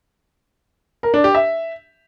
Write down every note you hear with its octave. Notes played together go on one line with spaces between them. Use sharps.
A#4
D4
G4
E5